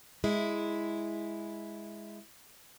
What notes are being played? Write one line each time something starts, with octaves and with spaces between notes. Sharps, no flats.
G#3 E4